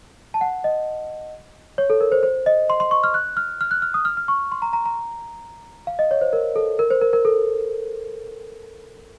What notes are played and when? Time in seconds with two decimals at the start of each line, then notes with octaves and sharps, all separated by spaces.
0.34 A5
0.41 F#5
0.64 D#5
1.78 C#5
1.90 A4
2.01 A#4
2.12 C5
2.23 C5
2.46 D#5
2.70 C6
2.80 C6
2.91 C#6
3.04 F6
3.14 F#6
3.37 F6
3.61 F6
3.71 F#6
3.82 F6
3.94 D#6
4.05 F6
4.17 F6
4.28 C#6
4.52 C6
4.62 A#5
4.73 A#5
4.85 A#5
5.87 F5
5.99 D#5
6.11 C#5
6.21 C5
6.33 A#4
6.56 A4
6.79 A#4
6.91 C5
7.01 A#4
7.13 A#4
7.25 A4